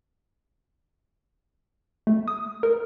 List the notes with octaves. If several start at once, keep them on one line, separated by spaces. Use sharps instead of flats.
A3
D#6
A#4